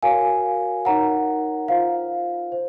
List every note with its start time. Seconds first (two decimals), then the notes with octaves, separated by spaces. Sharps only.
0.03 F#4 A#4 C#5 F5 G#5
0.85 D#4 A#4 C#5 F#5 A#5
1.68 F4 C5 F5
2.52 C5